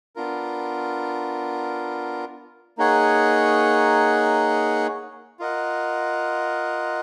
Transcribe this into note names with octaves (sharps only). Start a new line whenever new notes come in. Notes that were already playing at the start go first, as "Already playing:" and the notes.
B3 D4 F4 A#4
A#3 D#4 G#4 C#5 F#5
F4 A#4 D#5 F#5